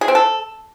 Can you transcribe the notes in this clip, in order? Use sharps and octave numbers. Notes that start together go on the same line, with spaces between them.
G#4
C4
A4